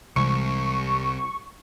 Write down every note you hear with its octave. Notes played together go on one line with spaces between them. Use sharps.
C2 C3 E3 G#3 C#6